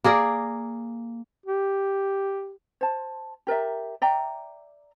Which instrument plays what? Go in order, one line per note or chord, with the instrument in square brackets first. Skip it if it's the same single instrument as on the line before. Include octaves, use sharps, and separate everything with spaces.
[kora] A#3 G#4 A#4 D5
[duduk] G4
[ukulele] C5 A5
G4 A#4 D5 E5
D5 E5 G5 A#5